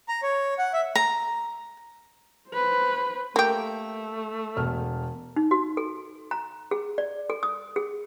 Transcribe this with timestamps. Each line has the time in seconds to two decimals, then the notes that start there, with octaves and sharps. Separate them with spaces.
0.08 A#5
0.23 C#5
0.58 F#5
0.73 E5
0.96 A#5
2.50 B4 C5
3.36 A3 A#3 G4
4.57 E1 F6
5.36 D#4
5.51 F#4
5.77 A4
6.31 A#5
6.71 G#4
6.98 D5
7.30 A4
7.43 D#6
7.76 G#4